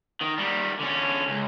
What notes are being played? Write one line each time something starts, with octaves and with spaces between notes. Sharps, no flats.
D#3
D#3 G3
D3 C#4
C#2